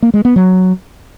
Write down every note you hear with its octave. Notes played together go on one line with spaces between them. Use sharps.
A#3
G#3
B3
F#3